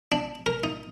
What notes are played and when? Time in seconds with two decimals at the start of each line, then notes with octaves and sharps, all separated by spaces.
0.12 D4
0.46 A#4
0.64 D#4